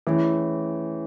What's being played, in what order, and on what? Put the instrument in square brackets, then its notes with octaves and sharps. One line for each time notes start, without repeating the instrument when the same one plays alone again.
[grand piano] E3 [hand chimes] A3 C#4 E4 G#4 C#5